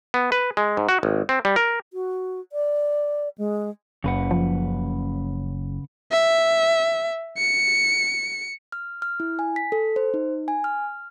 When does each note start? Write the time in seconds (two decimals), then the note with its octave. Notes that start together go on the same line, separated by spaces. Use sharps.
0.14 B3
0.32 B4
0.57 G#3
0.77 G#2
0.89 F#4
1.03 G#1
1.29 C4
1.45 G3
1.56 A#4
1.93 F#4
2.52 D5
3.38 G#3
4.04 F#1 C#3 B4 F#5
4.31 F3
6.11 E5
7.38 C#7
8.72 F6
9.02 F6
9.20 E4
9.39 G#5
9.56 B6
9.72 A4
9.96 C5
10.14 D#4
10.48 G#5
10.64 F6